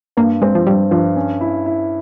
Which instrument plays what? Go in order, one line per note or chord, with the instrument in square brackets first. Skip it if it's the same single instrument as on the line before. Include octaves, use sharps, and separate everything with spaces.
[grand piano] G2 [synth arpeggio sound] A#3
[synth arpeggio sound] G#3 [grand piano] C4
[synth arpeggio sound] F3
[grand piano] G2 [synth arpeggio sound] G3
[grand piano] G2 [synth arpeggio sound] F3
[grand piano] C#4
E4
E4